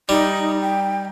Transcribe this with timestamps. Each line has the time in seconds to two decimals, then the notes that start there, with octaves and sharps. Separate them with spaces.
0.09 G3 D#4
0.62 G5